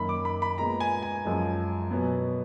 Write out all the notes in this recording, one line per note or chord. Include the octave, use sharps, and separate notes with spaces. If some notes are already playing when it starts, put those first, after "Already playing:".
Already playing: F#2 D#3 A#3 B5
D6
B5
B5
A#2 G#3 B3 A#5
G#5
G#5
F#2 F3 G#3
B2 F#3 B3